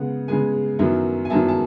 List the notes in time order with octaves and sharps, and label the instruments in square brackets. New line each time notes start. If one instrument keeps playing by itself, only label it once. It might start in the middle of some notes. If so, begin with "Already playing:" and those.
Already playing: [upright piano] C#3 G#3 B3 F#5
C#3 G#3 B3 G#5
F#2 D#3 F#3 B3 E4
G#5
F#2 D#3 F#3 B3 E4 A5
A5